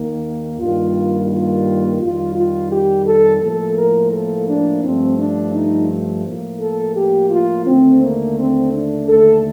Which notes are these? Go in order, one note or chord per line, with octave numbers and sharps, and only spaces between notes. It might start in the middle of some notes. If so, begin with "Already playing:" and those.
Already playing: D#2 D#3 A#3
G2 D#3 G3 A#3 F4
F4
F2 D#3 G3 F4
F4
G4
A4
A2 F3 A#3 A4
A#4
A4
D4
G2 F3 A3 C4
D4
D#4
A2 F3 A#3
A4
G4
F4
D#2 D3 A3 C4
A#3
C4
D4
D#2 D3 A3 A4